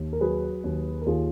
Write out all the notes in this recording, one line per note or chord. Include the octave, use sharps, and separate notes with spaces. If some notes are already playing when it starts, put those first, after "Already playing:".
Already playing: D#2
A#4
F#3 G#4 B4
D#2
A#4
D#2 F4 G#4